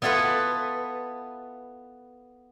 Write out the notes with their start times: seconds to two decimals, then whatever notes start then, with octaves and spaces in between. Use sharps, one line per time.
0.02 B3 E4 F4 A4 B4